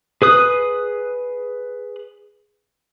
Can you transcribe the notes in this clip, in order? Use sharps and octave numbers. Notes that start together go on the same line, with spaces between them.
G#4 B4 D#6 F#6